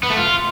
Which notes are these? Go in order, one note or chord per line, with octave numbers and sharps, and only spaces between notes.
B3
A3
F4